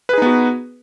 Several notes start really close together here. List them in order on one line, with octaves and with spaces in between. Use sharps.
B4 G#4 D#4 B3 F#4